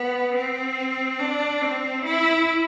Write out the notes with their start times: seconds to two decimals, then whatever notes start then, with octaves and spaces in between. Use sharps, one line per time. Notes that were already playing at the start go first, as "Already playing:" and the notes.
Already playing: B3
0.34 C4
1.19 D4
1.62 C4
2.05 E4